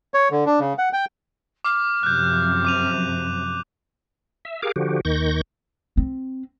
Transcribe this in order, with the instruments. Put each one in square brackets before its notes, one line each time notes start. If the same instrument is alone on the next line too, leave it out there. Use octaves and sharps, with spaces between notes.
[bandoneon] C#5
D3
D4
C#3
F#5
G5
[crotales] D6 [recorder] F6
[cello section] F#2 C3 F3 [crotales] F#6 G6
[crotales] D6 D#7 F7
[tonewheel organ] E5
G4 G#4 A#4 F5 D6
D3 F3 F#4 G4
D#2 D#3 C#6 G6 A#6
[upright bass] C4